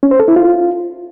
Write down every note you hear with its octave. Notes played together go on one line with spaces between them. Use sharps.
C#4
C5
A4
E4
F4